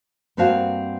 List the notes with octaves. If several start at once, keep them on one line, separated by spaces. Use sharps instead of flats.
G2 A#3 C4 F#4 F5 A5